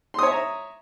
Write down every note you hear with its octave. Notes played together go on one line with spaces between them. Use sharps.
C#5 E5 A#5 C6 D#6